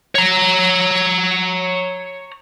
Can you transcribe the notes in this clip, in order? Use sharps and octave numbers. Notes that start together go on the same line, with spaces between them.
C#5 A#5